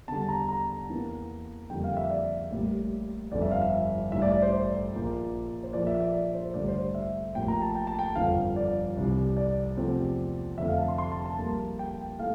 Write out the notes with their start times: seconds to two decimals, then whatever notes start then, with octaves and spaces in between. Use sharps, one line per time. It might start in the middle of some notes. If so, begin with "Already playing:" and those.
0.08 E2 D3 G3 A5
0.28 A#5
0.49 A#5
0.89 E2 E3 A#3
1.70 F2 D3 G3 A#3 G5
1.84 F5
1.97 E5
2.10 D5
2.51 A1 A2 G3 A#3
3.31 G1 F2 D3 D5
3.42 E5
3.51 F5
3.62 E5
4.12 A1 G2 E3 E5
4.22 D5
4.32 D5
4.42 C5
4.52 D5
4.92 A#1 A#2 F3 A#3
5.63 C5
5.73 A#1 A#2 F3 A#3 D5
5.87 E5
6.00 D5
6.14 D5
6.34 C5
6.54 A1 G2 D3 D5
6.68 C5
6.81 D5
6.95 E5
7.35 A1 A2 F3 A#3 G5
7.48 A#5
7.62 A5
7.75 G5
7.87 A5
7.99 G5
8.16 G1 F2 D3 F3 F5
8.56 D5
8.97 C2 C3 E3
9.37 D5
9.77 E2 C3 F3 A3 C4
10.58 F1 F2 D3 A3 C4 E5
10.68 F5
10.78 A5
10.88 C6
10.98 C6
11.12 A5
11.26 A5
11.39 A#1 A#2 G3 A#3
11.79 G5
12.19 E3 A3 F5